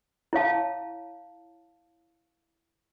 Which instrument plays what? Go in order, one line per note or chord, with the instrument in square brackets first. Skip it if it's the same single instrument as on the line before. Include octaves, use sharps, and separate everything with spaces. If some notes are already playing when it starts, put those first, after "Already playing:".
[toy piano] E4 C#5 F5 A5